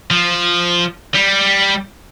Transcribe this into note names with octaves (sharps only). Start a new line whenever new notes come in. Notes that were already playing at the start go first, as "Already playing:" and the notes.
F3
G3